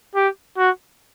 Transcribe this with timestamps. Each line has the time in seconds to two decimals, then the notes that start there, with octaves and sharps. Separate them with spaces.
0.15 G4
0.57 F#4